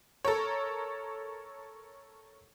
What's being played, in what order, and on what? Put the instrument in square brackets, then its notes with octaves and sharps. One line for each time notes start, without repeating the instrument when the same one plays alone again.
[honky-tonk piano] A4 A#4 C#5